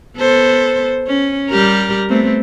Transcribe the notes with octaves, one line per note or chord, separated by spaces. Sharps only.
B3 A4 C5
C#4
G3 G4 A#4
A3 B3 C4